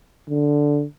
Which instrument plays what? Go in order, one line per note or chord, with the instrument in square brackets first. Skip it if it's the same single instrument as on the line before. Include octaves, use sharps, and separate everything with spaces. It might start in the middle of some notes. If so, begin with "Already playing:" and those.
[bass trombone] D3